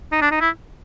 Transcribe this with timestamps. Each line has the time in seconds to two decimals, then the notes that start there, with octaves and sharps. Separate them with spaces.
0.12 D#4
0.22 D4
0.31 D#4
0.41 E4